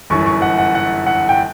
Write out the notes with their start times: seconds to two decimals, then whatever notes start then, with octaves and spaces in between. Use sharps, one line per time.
0.10 G1 F#2 E3 C#6
0.26 C#6
0.42 F#5
0.58 F#5
0.75 F#5
1.06 F#5
1.29 G5